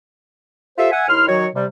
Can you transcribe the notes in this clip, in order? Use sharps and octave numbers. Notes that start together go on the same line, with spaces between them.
F4 G4 A4 C5 E5
E5 F#5 G#5
D#2 E4 C6 F6
D#3 F#3 F#4 C#5
C3 G3